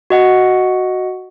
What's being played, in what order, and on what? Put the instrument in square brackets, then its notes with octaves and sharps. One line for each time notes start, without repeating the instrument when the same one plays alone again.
[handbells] F#4 D#5 F#5